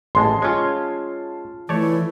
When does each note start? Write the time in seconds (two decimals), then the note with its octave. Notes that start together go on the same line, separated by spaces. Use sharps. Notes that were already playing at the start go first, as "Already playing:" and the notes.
0.15 A1 G#3 A5 C6
0.42 G#3 C#4 F4 C#5
1.69 E3 A3 C#5 D5